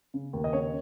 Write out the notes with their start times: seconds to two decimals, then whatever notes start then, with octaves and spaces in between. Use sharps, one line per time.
0.14 C#3
0.33 D#2
0.44 D#5
0.53 C#3 C#5